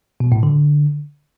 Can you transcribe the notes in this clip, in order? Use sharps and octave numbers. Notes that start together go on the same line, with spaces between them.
B2
A2
D3